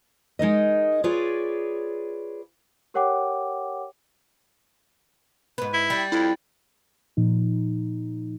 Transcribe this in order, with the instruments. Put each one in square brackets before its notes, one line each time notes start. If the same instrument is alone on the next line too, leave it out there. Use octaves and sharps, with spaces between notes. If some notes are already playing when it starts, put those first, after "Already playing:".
[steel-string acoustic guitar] G#3 D#4 A#4 D#5
F4 G#4 B4 C#5 D5
[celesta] G4 A#4 C#5 F#5 G5 D6
[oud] G#2 B4
[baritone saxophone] E4
[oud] G3
[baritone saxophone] F2 [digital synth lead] E4
[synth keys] A#2 F3 D#4